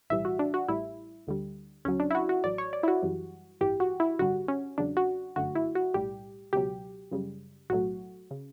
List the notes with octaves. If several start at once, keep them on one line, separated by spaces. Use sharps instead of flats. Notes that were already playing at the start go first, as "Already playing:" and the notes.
B1 A2 E3 G3 E5
F#4
D4
F#4
A1 A2 G3 E4
D2 D3 G3
D2 C#3 F#3 C#4
D4
E4
F#4
F#4
A1 A2 F#3 D5
C#5
D5
E4
F#4
F#2 E3 G3
A1 G2 E3 G4
F#4
E4
A1 G2 D3 G3 F#4
C#4
E2 C#3 F#3 D4
F#4
G1 F#2 D3 A3 F#4
E4
F#4
B1 A2 G3 G4
C#2 B2 F#3 G4
F#2 C#3 G3
B1 A2 F#3 A3 F#4
C#3